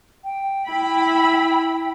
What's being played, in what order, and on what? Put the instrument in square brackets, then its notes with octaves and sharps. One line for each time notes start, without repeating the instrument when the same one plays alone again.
[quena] G5
[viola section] E4 B5